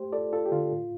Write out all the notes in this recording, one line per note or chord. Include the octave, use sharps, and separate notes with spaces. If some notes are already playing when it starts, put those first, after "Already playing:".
Already playing: A3 G4 C5
F4 A4 D5
F4 A4
G4
D3 F4
A2